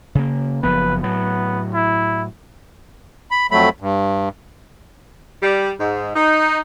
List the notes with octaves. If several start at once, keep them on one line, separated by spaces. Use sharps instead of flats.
C#3 A#3
F#1 F3 B3 B4
A2 F#3 B3
E4
B5
F2 F#3 A3 B5
G2
G3
G#2
D#4